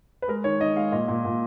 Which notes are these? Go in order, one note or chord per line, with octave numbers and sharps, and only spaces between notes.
B4
G#3 A#4
D#3 C#5
D#3 D#5
G#3 F5
A#2 D#5
A#2
A#2